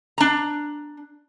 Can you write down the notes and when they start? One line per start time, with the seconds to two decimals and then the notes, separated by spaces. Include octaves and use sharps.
0.18 D4 A#5